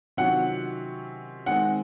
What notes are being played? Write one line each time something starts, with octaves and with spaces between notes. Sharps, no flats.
C3 D#3 F#3 C#4 F4 F#5
D#3 G#3 C4 F#5